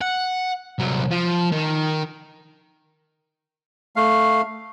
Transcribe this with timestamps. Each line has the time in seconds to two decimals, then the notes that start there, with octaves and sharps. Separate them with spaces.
0.01 F#5
0.79 C2 F#3
1.11 F3
1.52 D#3
3.96 A3 F5